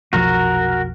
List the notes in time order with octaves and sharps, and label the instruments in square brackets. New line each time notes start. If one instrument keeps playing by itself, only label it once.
[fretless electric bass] F1 B1 F3 [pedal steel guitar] F#4 A#4